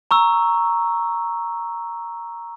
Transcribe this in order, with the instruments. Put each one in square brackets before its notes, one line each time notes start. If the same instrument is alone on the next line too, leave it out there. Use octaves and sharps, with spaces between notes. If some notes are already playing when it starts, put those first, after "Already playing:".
[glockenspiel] A#5 C#6 E6